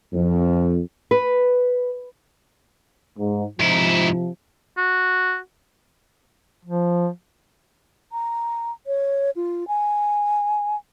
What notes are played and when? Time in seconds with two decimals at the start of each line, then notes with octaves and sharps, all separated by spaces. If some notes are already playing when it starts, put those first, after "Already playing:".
0.14 F2
1.11 B4
3.19 G#2
3.60 G#2 C3 F3 E4
4.77 F#4
6.65 F3
8.12 A#5
8.87 C#5
9.36 F4
9.68 G#5